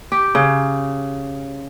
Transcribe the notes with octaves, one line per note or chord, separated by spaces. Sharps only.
G4
C#3